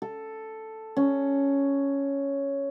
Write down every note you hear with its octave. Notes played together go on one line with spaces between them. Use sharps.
A4
C#4